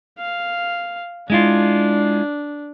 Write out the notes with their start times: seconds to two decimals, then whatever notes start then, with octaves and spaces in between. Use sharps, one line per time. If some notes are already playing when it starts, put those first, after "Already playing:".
0.19 F5
1.30 G#3 D4 E4 F4